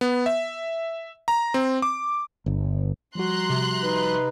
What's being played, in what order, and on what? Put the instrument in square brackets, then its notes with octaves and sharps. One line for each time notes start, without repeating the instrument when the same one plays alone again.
[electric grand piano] B3
E5
A#5
C4
D6
[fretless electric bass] G1
[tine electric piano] F3 G3 F#4 [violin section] A#5 C6 F#6
[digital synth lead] C3
[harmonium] D#4 B4